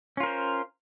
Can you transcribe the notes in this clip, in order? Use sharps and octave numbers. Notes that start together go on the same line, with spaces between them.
C#4 F4 A#4 C5